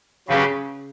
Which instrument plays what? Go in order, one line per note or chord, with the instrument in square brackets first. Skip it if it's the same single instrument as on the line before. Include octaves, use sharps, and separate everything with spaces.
[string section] C#3 [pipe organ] F#3 C#4 G4 B4